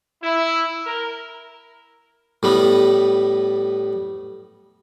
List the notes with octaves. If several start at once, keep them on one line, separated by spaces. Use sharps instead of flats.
E4
A#4
A2 G3 B3